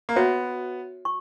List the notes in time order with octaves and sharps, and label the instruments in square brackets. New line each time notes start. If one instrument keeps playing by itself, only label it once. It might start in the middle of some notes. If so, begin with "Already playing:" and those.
[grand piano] A#3
[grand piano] B3 [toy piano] F#4 C#5 E5
[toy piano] C#6